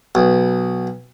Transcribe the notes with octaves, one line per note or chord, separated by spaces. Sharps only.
B1